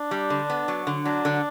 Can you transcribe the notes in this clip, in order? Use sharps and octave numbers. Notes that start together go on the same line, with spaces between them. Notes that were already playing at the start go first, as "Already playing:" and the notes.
Already playing: D4
G3
D3
B3
F#3
D3
F#3 D4
D3